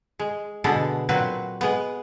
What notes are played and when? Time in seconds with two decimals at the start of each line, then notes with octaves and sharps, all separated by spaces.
0.19 G#3
0.64 B2 D3 G#3 B3 A4
1.09 A#2 F#3 C4 F#4 B4
1.61 G#3 B3